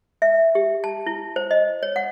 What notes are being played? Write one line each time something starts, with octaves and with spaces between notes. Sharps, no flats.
E5
G4
A5
E4
C5
D#5
C#5
F#5